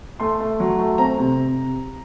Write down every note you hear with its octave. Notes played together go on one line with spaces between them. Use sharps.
A3 C6
A3
F#3
A3
C4 A#5
C3